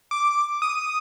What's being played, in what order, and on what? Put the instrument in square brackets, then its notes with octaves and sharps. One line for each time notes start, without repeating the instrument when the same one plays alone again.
[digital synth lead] D6
D#6